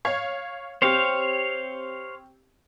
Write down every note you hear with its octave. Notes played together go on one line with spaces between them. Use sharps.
C#5 F5 G#6
C4 G4 C5 C#5 F5